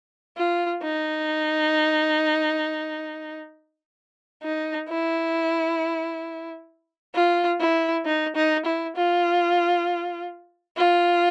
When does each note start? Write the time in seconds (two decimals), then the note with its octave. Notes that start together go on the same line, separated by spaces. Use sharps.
0.37 F4
0.82 D#4
4.43 D#4
4.89 E4
7.15 F4
7.60 E4
8.05 D#4
8.36 D#4
8.65 E4
8.96 F4
10.77 F4